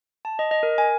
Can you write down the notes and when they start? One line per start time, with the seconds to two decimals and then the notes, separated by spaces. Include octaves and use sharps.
0.25 A5
0.39 D#5
0.51 D#5
0.63 A#4
0.78 G#5